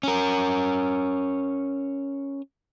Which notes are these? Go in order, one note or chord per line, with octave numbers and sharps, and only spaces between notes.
C#4 A#4